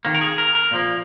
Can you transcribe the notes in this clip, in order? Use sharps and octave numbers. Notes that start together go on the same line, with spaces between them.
D#3 A#3
A#4
G#4
A#4
A#4
A#2 F3 A#3